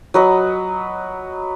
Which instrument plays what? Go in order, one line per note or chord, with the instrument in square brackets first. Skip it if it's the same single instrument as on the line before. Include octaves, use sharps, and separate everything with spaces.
[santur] F#3 B4 D#5